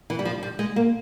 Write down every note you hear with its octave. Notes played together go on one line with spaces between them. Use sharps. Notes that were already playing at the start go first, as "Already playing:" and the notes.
E3
G3
F3
G3
G#3
A#3